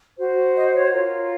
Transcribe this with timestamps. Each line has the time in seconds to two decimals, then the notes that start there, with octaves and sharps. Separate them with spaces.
0.18 F#4 C5
0.55 D#5
0.74 C#5
0.92 F4 A#4 C#5